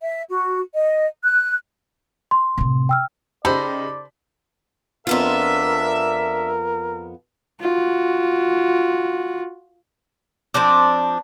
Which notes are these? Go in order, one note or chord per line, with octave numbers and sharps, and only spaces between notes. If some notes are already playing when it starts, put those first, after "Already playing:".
E5
F#4
D#5
F#6
C6
A2 C3
G5 E6 F6
C#3 D#4 G4 A4 C5 D5 B5
F2 B3 D4 F4 A#4 E5
F4 F#4
F3 C4 D4 D5